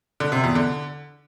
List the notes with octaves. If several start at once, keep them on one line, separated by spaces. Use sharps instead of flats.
D3
C3
E2
D3